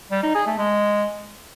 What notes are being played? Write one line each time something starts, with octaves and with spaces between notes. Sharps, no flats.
G3
D#4
G#4
A3
G#3